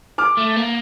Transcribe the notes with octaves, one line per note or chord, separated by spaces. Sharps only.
D6 F6
A3
A#3